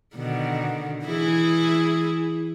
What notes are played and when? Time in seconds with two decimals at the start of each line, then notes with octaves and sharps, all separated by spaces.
0.15 B2 D3 D#3
1.04 E3 E4 G#4